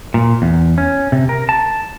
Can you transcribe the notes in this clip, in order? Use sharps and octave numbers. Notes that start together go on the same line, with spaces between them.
A#2
E2
C#4
C3
A#4
A5